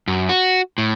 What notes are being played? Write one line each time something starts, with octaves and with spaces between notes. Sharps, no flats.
F#2
F#4
A2